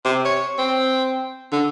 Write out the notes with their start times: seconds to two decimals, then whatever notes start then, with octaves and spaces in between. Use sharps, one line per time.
0.05 C3
0.25 C#5
0.58 C4
1.52 D3